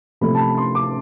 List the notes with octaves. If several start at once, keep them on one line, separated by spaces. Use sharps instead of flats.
C3 F3 A3 B5
A5
B5
C6
D6